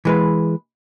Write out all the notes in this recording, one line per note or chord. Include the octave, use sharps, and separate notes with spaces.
E3 G#3 B4